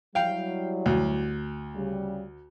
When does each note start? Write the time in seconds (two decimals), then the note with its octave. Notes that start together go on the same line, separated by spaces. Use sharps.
0.15 F#3 G3 E4 F5 G5
0.86 D2
1.76 C#3 G3